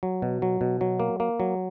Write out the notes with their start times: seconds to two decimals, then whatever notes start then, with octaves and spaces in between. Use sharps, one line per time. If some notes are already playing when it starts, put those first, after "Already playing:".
0.03 F#3
0.22 B2
0.42 F#3
0.61 B2
0.81 F#3
1.00 A#3
1.20 A#3
1.40 F#3